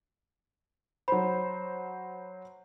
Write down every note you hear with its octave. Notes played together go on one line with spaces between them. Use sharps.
F#3 C5 B5